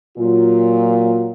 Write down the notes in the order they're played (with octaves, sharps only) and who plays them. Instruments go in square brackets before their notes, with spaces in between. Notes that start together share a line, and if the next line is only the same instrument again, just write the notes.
[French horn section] A#2 F#3 F4